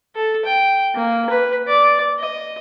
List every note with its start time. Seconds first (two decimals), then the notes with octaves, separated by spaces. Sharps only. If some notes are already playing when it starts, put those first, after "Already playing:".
0.15 A4
0.45 G5
0.95 A#3
1.30 B4
1.68 D5
2.19 D#5